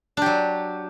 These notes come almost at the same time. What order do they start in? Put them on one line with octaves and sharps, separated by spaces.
D4 G4 F#3